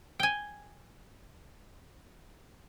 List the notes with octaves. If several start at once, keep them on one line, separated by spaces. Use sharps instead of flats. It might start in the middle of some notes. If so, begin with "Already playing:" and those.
G5 G#5